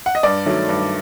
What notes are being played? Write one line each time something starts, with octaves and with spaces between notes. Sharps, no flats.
F#5
D#5
G2 D5
D#3 F#3 A3
G2